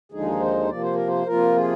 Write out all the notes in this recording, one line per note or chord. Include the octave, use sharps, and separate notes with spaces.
D#2 D3 F3 G#3 D#4 G#4
C5
C3 F3 A#3 D5
C5
A#4
C5
C3 F3 A#3 F4 A#4
G#4